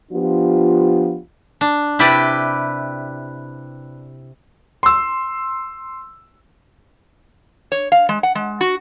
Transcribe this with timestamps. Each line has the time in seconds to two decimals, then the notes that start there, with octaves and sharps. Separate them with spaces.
0.11 F3 B3 D4 F4 G4
1.61 D4
1.99 C3 E4 G4 B4 D5 G5
4.83 C6 E6
7.72 C#5
7.92 F5
8.09 G#3
8.23 F#5
8.35 G#3
8.61 F#4